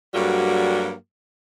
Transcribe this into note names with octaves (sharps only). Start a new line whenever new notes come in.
G2 F#3 G3 A3 A#3 F#4